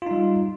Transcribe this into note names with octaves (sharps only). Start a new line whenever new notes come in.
G3 D#4 F4